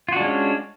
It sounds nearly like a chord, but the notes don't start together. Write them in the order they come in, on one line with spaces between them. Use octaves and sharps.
F4 F#4 D4 G#3 C#4